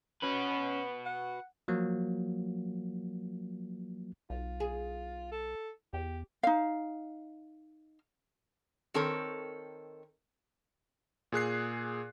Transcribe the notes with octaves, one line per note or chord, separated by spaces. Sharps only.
C#4 F#4 B4
F#5
F3 F#3 A#3 F#4
B1 F4
G#4
A4
E2 G4
D#4 F5
D#3 C4 A4 A#4 C#5
A#2 G#4 F#6 C7